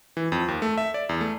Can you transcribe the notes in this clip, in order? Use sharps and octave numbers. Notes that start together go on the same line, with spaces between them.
E3
F2
D#2
A3
E5
D5
E2
A3